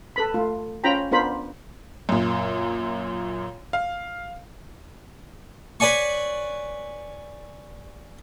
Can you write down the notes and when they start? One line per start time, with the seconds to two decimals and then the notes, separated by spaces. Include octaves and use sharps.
0.16 A4 B4 B5
0.34 A3 F4
0.84 C#4 F4 C5 G5 A#5 B5
1.11 B3 D4 F4 A#4 C5 B5
2.09 F#2 A#2
3.73 F5
5.80 B4 C#5 D5 G#5 C#6